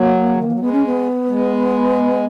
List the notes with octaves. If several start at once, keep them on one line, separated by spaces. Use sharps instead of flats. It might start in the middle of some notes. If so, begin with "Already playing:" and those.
Already playing: F#3 A#3
C#3
D#3
E3
F#3
G#3 B3
C#4
B3
G#3